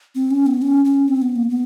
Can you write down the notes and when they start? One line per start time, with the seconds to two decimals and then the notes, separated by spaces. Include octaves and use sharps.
0.15 C4
0.31 C#4
0.46 B3
0.62 C#4
0.85 C#4
1.08 C4
1.22 B3
1.36 A#3
1.50 B3